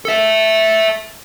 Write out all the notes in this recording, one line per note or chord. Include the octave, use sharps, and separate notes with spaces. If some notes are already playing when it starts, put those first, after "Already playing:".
A4 E5